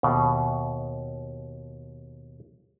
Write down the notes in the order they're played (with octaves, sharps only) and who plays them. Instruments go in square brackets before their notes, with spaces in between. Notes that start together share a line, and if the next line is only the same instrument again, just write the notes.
[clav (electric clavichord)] D#2 B2